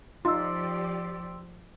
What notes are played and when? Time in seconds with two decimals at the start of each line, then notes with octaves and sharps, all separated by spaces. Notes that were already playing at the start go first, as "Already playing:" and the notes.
0.25 F3 D#4 F4 G4 D5 C6 E6